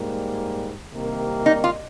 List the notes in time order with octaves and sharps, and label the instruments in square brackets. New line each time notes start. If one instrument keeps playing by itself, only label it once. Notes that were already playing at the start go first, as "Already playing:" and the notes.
Already playing: [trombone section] G#2 G3 A#3
C2 C3 D#3 A#3
[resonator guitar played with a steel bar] D#4
F4